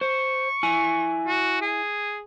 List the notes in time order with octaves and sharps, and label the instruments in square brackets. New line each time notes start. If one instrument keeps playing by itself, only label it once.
[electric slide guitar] C5 [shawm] C#6
[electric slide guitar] E4 G#5
[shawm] F#4
G#4